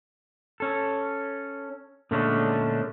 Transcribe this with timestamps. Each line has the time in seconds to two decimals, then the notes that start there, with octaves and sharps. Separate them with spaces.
0.60 C#4 A4
2.11 A#2 D3 G#3 A3 C#4 D4